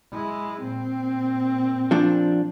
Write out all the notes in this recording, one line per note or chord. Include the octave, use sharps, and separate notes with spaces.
G#3 E4
A#2 C4
F3 D4